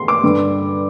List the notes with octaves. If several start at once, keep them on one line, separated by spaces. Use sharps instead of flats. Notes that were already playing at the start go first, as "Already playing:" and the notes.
Already playing: C6
D6
G2 D3